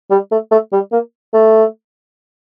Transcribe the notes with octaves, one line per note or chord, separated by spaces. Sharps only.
G3
A3
A3
G3
A#3
A3